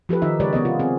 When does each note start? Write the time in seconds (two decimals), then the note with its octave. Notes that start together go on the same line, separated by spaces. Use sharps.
0.09 F3 G4 A4 B4
0.22 D#3 D#4 E5
0.40 C#3 G#3 G4 B4 C#5 D5
0.53 C3 B3 C#5 D#5
0.65 F4
0.80 C4 G#4